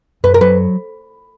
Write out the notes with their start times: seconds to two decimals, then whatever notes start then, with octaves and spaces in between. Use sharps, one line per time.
0.24 F#2 B4
0.34 A#4
0.41 F#3 B4